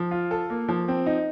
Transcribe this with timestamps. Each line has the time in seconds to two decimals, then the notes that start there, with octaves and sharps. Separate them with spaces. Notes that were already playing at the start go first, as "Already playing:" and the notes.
Already playing: F3
0.11 F4
0.31 A4
0.50 A#3
0.68 F3
0.88 C4
1.06 D#4